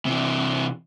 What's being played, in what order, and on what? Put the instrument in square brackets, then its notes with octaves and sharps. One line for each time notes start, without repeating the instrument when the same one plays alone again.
[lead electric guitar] C3 E3